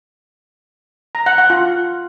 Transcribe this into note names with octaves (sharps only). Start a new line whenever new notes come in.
A#5
F#5
F#5
F4